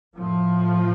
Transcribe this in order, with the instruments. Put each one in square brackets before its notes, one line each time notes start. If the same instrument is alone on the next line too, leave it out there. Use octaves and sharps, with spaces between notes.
[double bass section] A2 F3